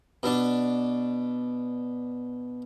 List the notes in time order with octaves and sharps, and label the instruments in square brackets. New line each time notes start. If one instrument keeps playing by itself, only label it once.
[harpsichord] B2 D4